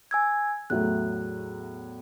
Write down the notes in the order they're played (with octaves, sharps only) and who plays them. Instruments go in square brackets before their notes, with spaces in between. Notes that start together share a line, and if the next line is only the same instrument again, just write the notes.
[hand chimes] G#5 E6 G#6
[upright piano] E2 A2 F#3 [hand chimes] F#6